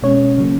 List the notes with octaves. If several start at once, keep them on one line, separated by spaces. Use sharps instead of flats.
B2 G#3 C#4 C#5
C#3 F#3 A#3 C#4